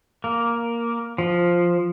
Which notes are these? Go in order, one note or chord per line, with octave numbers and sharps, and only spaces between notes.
A#3
F3